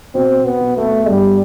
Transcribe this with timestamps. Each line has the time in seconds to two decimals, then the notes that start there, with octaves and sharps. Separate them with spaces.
0.14 B2 C4
0.38 B2
0.45 B3
0.61 B2
0.77 A3
0.85 B3
1.07 G2 G3